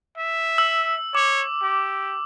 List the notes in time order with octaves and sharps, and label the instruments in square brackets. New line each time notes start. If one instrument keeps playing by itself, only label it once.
[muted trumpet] E5
[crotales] E6
[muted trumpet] C#5 [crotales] D6
[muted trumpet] G4